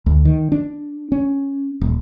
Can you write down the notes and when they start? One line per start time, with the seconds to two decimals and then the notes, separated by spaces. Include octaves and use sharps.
0.06 D2
0.25 D#3
0.52 D4
1.12 C#4
1.81 D#1